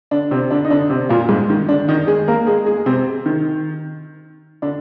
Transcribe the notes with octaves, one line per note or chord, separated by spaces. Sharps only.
D3 D4
C3 C4
D3 D4
D#4
D3 D4
C3 C4
A#2 A#3
G#2 G#3
D#3
D3 D4
D#3 D#4
G#3 G#4
A#3 A#4
G#3 G#4
G#3 G#4
C3 C4
D#3
D3 D4